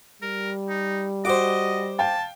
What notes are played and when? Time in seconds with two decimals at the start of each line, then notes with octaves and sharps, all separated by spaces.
0.22 G3 A#4
0.69 D#4
1.25 F#4 C5 D#5 D6
1.99 F5 G5 A5